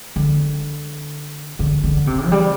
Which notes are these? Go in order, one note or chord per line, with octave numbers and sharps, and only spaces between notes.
D3
D3
D3
C3
F#3
G3